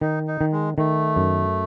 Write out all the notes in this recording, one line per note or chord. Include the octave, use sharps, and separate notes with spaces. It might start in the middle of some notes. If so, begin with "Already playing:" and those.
D#3 D#4
D#4
D#3
G#3
D#3 A3
F#2